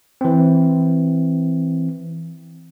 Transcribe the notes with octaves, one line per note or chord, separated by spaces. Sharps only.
E3 C4